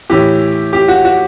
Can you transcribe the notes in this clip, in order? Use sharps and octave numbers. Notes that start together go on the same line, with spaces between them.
A2 E3 G4
G4
F#4
F#4